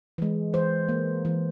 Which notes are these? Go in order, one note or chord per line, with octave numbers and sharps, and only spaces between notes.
E3 G#3
E3 C5
A#3
E3